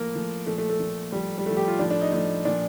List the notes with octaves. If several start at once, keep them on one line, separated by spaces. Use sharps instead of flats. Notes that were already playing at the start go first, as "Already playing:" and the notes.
Already playing: A2 F3 A#3
A2 F3
A#2 F3 A3
A3
A3
A#2 F3
A2 F3 G3
G3
A2 F3 A3
G4
F4
A2 F3 D4
D4
D#4
A2 F3 D#4
A#2 F3 D4